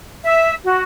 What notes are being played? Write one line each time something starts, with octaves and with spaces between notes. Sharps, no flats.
E5
F#4